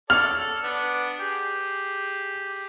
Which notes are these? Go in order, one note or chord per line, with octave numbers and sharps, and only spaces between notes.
A4 C#5 D5 F6
A4
B3 D4
G4 G#4